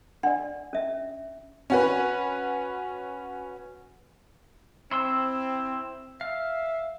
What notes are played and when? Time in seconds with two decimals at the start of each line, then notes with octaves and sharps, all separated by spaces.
0.23 D4 D5 F#5
0.73 C#4 E5
1.70 C#4 F#4 B4
4.91 C4 E4 C6 E6
6.21 E5 F5